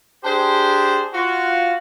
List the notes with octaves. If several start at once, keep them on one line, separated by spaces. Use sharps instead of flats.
D4 G4 G#4 C5
F4 F#4